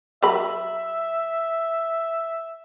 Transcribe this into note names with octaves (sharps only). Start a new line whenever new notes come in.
F#3 A#4 E5 B5